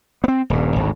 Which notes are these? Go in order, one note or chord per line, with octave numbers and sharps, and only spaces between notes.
B3 C4
D#1 G2
G#1 D2